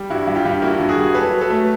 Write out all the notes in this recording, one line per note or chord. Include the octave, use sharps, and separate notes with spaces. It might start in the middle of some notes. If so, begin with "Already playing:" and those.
Already playing: G3
G2 E4 F#4
G2
F4 G4
G2
A#3 E4 F#4
G2
F#4 G#4
G3
F#3 A4 B4
F#3
A4 B4
A3